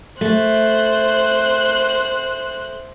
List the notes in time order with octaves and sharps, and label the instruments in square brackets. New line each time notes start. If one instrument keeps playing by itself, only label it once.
[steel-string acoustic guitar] A3 [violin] C5 F#6